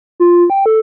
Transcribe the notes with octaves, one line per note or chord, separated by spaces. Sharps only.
F4
G5
A4